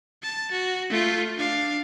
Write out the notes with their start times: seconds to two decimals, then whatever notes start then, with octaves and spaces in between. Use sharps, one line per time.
0.23 A5
0.52 F#4
0.90 A3 F4
1.37 D4 F5